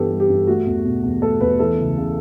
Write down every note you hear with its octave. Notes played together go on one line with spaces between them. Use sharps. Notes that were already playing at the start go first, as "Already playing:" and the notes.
Already playing: G2 E3 G3 B3 G4 A4
G3
G4
G2
A3 F#4
E2
B2
E2
A3 A4
E2 B4
E3 A4
C#2
C#3